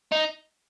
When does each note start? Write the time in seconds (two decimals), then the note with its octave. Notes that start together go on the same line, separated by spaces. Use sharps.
0.12 D#4